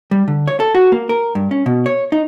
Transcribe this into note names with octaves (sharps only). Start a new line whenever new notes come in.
G3
D3
C#5
A4
F#4
A#3
A#4
G2
C#4
B2
C#5
D#4